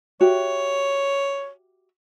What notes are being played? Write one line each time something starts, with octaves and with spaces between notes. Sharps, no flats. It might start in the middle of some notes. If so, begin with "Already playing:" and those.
F#4 G4 C#5 E5